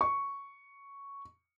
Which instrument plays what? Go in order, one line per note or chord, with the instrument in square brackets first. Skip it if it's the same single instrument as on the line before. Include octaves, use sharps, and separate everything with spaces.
[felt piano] C#6